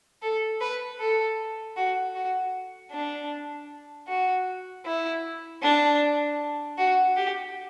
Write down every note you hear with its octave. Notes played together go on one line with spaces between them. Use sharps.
A4
B4
A4
F#4
F#4
D4
F#4
E4
D4
F#4
G4